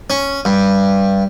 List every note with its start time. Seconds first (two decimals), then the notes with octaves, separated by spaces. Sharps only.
0.10 C#4
0.45 G2